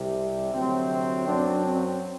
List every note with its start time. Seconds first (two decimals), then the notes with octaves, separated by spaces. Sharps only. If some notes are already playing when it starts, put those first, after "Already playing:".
Already playing: C2 C3 G3 C4
0.54 D2 C3 F#3 C4
1.27 F#2 F#3 C4 D4
1.64 C4